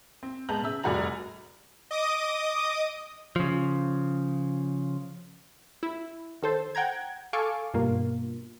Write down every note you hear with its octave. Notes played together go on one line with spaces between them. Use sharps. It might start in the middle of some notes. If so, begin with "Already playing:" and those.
C4
G#3 B3 A5 A#5 G6 F#7
C#3 E5 E6
F1 G3 F#4 G#4 A#5 F#7
D#5 D6 D#6
C#3 F3
E4
D#3 A4 C5
F#5 G5 A#5 G#6
A4 F5 G#5 C#6 D6
G2 B2 A#3 F4